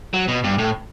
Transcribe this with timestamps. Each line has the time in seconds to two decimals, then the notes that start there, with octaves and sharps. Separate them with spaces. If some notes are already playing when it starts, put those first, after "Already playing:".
0.14 F#3
0.28 B2
0.44 G2
0.59 A2